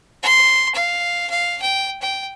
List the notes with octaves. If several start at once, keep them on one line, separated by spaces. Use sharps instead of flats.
C6
F5
F5
G5
G5